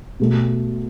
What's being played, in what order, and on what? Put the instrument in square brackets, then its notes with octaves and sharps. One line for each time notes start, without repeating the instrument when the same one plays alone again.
[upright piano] B2 A3